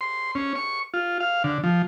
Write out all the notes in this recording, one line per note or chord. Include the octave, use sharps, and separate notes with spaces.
C6
C#4
C#6
F4
F5
D3
F3